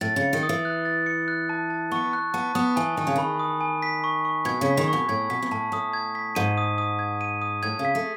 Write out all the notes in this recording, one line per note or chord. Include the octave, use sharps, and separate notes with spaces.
A2 A6
C#3
C#7
D#3
D#6
E3
F#6
A6
C#7
F#6
A5
A5
B3 C#6
F#6
B3 A5
B3 D#6
E3 G#5
D#3 G#5
C#3
D#3 B5
D#6
G#5
B6
C#6
C#6
B2 G#6
C#3
B6
D#3
B2 C#6
A2 G#6
B2 B6
B2
A2 A5
A2 D#6
G#6
B6
G#2 D#7
D#6
D#6
G#6
D#7
D#6
A2 G#6
C#3
B6
A3